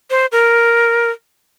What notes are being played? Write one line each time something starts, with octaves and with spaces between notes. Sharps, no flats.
C5
A#4